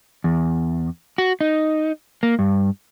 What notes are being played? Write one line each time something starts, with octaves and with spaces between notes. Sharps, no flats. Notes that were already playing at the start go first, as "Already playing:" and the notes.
E2
F#4
D#4
A#3
G2